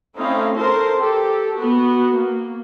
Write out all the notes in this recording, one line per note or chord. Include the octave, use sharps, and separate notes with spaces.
A3 C4 C#4 D#4 E4 F5
A4 A#4 C5 A5 C6
G4 A4
B3 F#4
A#3